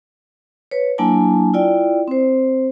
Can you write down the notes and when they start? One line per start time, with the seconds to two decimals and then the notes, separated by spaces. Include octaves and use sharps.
0.71 B4 C#5
0.98 F#3 A#3 D4 E4 G#5 A5
1.53 E4 F4 D5 G5
2.08 C4 C5